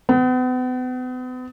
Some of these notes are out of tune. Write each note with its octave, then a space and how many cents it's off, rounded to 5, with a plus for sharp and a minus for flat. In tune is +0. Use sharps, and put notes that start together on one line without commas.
B3 +40